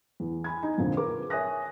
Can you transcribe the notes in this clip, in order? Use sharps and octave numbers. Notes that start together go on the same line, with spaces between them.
E2
G#5 B5 G#6
D#4
F2 A#2 D3 F3
G#4 A#4 B4 D6
C#5 E5 G#5 D#6 F#6 A#6